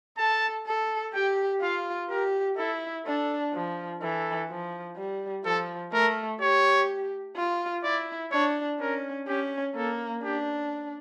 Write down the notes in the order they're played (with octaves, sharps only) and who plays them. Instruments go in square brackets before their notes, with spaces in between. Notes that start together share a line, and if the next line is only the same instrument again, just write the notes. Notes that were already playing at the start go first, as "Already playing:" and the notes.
[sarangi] A4 [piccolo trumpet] A5
[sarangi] A4
[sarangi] G4 [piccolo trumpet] G5
[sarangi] F4 [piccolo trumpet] F5
[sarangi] G4 [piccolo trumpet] A#4
[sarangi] E4 [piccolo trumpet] A4
[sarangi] D4 [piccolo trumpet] A4
[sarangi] F3
[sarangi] E3 [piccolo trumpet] A4
[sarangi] F3
G3
[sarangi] F3 [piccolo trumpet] A4
[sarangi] A3 [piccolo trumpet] A#4
[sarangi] G4 [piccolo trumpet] C#5
[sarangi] F4
[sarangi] E4 [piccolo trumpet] D5
[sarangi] D4 [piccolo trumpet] C#5
[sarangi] C#4 [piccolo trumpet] A#4
[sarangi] C#4 [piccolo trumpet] G4
[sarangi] A#3 [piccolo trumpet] A4
[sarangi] D4 [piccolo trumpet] G4